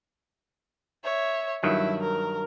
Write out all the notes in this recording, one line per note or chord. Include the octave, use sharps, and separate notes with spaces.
C#5 E5
G2 D#3 F#3 E4
A#4